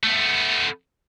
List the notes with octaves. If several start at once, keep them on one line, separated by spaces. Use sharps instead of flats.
A3 B3